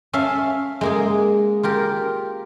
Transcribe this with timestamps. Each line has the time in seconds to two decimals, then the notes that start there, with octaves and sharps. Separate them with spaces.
0.13 C#4 E5 F5 A5
0.81 G#3 A#3 G#4
1.63 F4 G4 A#4